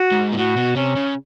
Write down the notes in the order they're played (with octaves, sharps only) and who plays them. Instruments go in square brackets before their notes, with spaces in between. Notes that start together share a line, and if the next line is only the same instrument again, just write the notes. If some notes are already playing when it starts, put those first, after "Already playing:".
Already playing: [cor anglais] F#4
[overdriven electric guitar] G#2
A#2
[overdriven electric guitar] A2 [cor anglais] F#4
[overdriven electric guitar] B2
[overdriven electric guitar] C3 [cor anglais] C#4
[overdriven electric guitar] C#3